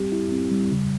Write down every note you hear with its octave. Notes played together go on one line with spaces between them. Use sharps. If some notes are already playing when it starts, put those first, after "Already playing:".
Already playing: G3 C4 G4
E4
C4
G3
C#3